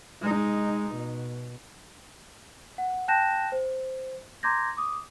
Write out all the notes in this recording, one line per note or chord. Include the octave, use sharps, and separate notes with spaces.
G#3 D#4
B2
F#5
G5 A5 F#6 G6 A#6 E7
C5
A#5 C6 D6 G6 G#6 A#6
D6 D#6